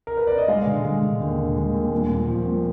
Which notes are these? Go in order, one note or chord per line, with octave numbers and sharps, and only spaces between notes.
A#4
B4
D5
D#5
G#3 F5
D3
G#3
D3
D#2
D3
G#3
D#2
A#2
A#2
F3
A#2